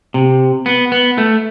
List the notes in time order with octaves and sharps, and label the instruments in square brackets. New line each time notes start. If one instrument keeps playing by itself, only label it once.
[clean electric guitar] C3
B3
B3
A3